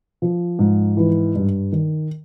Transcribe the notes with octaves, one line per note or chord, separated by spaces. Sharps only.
F3
G#2
E3
G2
D#3